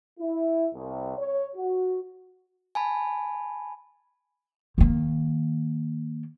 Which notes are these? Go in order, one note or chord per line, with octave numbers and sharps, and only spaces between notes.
E4
C2
C#5
F#4
G#5 A5 B5
D#3 A#3